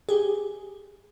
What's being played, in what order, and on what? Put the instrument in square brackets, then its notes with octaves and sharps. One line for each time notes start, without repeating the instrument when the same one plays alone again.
[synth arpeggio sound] G4 G#4